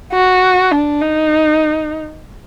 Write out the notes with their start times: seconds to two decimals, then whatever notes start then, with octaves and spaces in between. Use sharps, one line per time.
0.12 F#4
0.71 D4
1.01 D#4